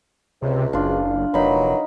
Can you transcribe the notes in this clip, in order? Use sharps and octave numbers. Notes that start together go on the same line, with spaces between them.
C#2 C3
F#1 D4 F4
F1 A#2 E3 F#3 D#4 B5